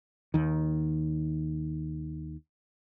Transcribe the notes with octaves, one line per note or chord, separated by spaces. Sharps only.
D#2 D#3